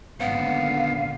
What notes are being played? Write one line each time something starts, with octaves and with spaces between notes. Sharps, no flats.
G#1 A#2 D3 B3 C#4 F5 F#5